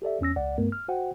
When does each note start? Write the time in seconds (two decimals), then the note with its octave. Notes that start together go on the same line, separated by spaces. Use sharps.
0.02 G4 A4 D5 E5
0.21 E2 C#4 E6 A#6
0.36 C#2 D5 F#5
0.58 G2 A3 B3 A#4
0.72 F6
0.88 F#4 C5 F#5 G5